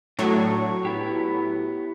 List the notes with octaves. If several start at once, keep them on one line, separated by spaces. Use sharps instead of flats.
A2 F#3 D4 C#6
B3 E4 G4